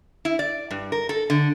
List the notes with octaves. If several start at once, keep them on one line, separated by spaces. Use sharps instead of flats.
E4
D5
G2
A#4
A4
D3